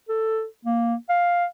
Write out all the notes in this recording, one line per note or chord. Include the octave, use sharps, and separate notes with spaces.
A4
A#3
F5